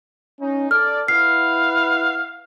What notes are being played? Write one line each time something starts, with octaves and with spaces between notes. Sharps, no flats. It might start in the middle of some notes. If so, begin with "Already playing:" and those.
C#4 D#4
A4 D5 F6
E4 B4 F5 F#5 F6 C7